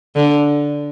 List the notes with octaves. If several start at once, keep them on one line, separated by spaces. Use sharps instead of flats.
D3